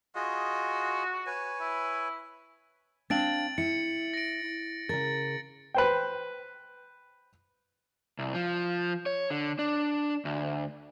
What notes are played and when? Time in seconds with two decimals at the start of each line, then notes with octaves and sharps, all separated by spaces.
0.15 F4 F#4 G#4 D#5
1.26 B4 C#5 G#5
1.61 E4
3.10 C4 D4 F5 A6 D7 F#7
3.58 E4 C#7
4.14 A#6 D7
4.89 C#3 A#4 A6
5.75 B4 C5 G5
8.19 C2
8.34 F3
9.06 C#5
9.30 D3
9.59 D4
10.25 D2